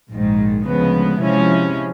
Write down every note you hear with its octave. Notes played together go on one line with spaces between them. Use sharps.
A#1 G#2 D#3
D2 C#3 F3 G#3 B3
C3 F3 G#3 C#4 E4